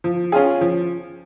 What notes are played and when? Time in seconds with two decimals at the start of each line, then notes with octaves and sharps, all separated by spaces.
0.04 F3
0.32 C#4 F4 G#4
0.61 F3